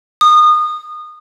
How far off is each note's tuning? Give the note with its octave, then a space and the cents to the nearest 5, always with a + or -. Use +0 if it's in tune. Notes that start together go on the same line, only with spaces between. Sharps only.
D#6 -25